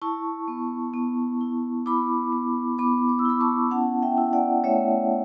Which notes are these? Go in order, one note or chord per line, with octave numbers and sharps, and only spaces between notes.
E4 A5 C#6
B3
B3
E4
E4 B5 D6
B3
B3 B5 D6
D6
E6
E4 B5 D6
A5 C#6
C#4 F#5 A5
E5 G5
E4
D5 F#5
A3 C#5 E5